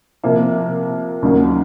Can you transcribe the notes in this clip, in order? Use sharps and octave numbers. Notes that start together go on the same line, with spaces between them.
C3 F3 A#3
D#2 C#3 F#3 A#3